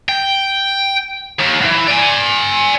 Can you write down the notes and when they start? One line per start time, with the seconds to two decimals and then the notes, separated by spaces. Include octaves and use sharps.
0.09 G5
1.39 D#2
1.62 E3 F#3
1.88 D5 G#5